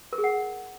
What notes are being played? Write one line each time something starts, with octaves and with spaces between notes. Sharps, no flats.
A#4
G#4
F#5